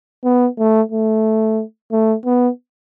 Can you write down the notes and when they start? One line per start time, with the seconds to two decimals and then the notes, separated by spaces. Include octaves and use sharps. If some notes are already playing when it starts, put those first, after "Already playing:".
0.24 B3
0.58 A3
0.92 A3
1.92 A3
2.25 B3